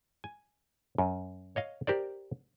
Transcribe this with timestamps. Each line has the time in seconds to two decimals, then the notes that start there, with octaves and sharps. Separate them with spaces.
0.24 G#5
0.98 F#2
1.56 C#5 D#5 F5
1.87 G4 A#4 C5 D5